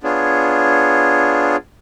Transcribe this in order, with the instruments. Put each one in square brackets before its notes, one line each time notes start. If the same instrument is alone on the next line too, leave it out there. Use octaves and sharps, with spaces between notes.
[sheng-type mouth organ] B3 D4 F4 G#4 C#5